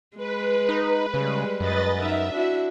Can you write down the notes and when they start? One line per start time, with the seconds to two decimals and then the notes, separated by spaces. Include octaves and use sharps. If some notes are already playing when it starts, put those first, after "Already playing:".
0.17 G#3 B4
0.69 D#4
1.14 C#3 G3 G#3
1.60 F#2 B4 D#5 A6
1.98 D#4 A#4 E5
2.32 D4 E4 F#4